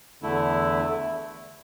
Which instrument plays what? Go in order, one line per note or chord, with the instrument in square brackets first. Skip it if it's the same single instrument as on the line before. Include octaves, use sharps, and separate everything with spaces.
[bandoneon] E2 D3 A3 E4